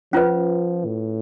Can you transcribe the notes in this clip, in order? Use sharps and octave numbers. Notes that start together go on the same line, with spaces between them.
F3 C#4 F4 B4
A2